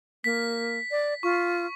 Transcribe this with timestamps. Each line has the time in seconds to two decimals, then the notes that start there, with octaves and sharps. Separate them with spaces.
0.24 A#3 B6
0.91 D5
1.23 F4 C#6